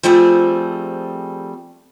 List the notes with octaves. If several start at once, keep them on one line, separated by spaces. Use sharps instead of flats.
F3 G3 A3 C4 G#4